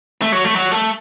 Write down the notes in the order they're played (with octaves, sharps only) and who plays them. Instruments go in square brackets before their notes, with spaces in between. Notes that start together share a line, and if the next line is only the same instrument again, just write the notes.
[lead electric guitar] A3
F#3
A3
F#3
A3